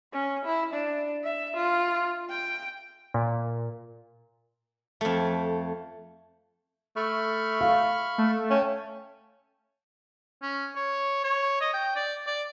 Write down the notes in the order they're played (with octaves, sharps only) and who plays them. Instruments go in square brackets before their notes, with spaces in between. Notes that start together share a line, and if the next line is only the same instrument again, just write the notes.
[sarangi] C#4
E4
D4
E5
F4
G5
[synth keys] A#2
[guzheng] F2 A3
[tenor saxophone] A3 [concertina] B5 C#6 F6
[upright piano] F5
[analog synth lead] A3
[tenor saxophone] C#4 [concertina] G5 A5
[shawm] C#4
C#5
C#5
D#5
G5
D5
D5